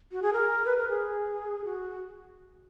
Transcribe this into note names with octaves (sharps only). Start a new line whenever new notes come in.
F#4
G#4
A#4
B4
A#4
G#4
F#4